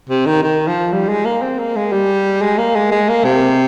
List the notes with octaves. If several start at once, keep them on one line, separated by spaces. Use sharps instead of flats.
C3
D#3
D#3
F3
G3
G#3
A#3
C4
A#3
G#3
G3
G#3
A#3
G#3
G#3
A#3
C3